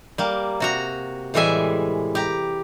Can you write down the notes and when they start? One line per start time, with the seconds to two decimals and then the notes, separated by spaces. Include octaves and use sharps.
0.18 G3 A#3
0.60 C3 F#4 A#5
1.34 A2 E3 G3 G#3 E5 G#5
2.15 G4 A#5